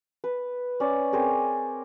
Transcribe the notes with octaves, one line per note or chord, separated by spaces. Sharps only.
B4
C#4 D5
C4 G#4 A#4 C5